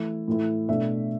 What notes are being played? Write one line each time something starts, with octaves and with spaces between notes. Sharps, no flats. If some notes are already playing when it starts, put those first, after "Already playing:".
Already playing: E3 A3 E4
A2 E3 A3 E4
B2 A3 D4 E5